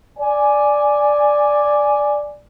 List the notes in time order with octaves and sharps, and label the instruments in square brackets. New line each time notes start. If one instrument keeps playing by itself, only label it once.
[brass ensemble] D5 G#5